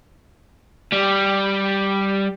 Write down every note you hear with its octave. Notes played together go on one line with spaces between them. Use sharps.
G3